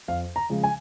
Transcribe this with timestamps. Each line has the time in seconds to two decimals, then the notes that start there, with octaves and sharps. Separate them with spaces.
0.08 F2 F5
0.36 A#5
0.50 C#3 F3 G#3
0.64 G#5